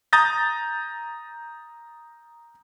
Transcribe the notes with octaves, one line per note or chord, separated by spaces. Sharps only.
A#5 D#6 G6 A6 A#6